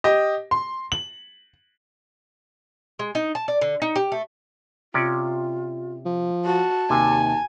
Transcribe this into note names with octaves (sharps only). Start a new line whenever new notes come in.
G4 D#5
C6
F#7
G#3
D#4
A5
D5
D3
D#4
G4
A3
C3 C#4 F4 D5
F3
F#4 A5
D#2 C3 G#5